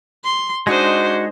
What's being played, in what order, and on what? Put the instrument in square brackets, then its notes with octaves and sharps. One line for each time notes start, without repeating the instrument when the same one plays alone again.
[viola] C6
[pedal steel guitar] G#3 D#4 D#5 [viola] D4 C5 [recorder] F#4